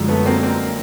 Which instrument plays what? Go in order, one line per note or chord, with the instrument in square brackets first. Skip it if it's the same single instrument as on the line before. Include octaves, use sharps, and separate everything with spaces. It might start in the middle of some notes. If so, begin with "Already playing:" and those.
Already playing: [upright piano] F#2 D3 F3 G#3
[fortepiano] A3 B3
A#3 C4
A#3 C4